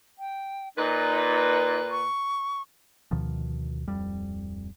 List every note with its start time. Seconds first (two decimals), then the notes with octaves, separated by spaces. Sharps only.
0.19 G5
0.76 A#2 D#4 B4
1.91 C#6
3.11 D2 B2 D#3 F3
3.88 D1 F2 G3